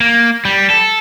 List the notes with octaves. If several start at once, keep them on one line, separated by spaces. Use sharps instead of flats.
A#3
G3
A4